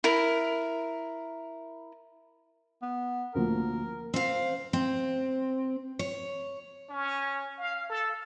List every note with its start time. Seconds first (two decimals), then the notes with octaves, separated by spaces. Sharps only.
0.04 E4 A#4
2.82 B3
3.35 D2 A#2 F3 A#4
4.14 C4 F5
4.73 C4
5.99 C#5
6.89 C#4
7.58 F5
7.90 A4